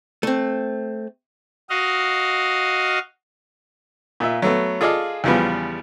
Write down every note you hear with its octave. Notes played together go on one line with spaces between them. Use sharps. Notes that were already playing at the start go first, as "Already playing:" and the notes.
A3 C4
F#4 D#5 F5
A#2 F4 E5
F#3 A3 B3
F4 G#4 A4 D5 D#5 F5
E2 C#3 F3 G3 B3